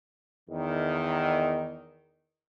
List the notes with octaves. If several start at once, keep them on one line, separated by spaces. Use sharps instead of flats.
E2 D#3